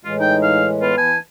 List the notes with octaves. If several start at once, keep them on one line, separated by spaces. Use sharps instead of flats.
A2 E3 G#3 F4
D#4 G5
F5
B3 F4
E3 G#5 A5